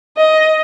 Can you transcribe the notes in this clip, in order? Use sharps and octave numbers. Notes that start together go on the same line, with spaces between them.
D#5